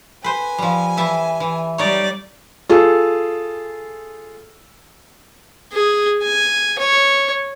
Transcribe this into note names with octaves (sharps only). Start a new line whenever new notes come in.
B4 C5 G#5
F3 G3
E3 E5 A5
E3
G3 D#4 C#5 D5
F4 G#4 A4
G#4
G#5
C#5